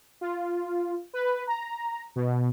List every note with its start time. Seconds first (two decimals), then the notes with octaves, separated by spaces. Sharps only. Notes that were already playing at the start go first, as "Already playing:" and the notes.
0.21 F4
1.13 B4
1.47 A#5
2.16 B2